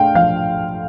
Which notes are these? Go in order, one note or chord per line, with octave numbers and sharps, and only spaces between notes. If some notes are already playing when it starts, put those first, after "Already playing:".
Already playing: A3 D4 F5 G5
F3 F5